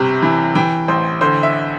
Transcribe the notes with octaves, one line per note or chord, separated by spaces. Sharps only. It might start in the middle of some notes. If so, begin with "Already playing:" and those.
Already playing: G1 C3
E3
E3 G5
A1 C5
D3 C5
E5